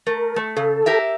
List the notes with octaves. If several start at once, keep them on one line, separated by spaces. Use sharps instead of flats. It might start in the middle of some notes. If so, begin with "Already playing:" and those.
A3 A#4
A3
C#3 A4
G4 A#4 E5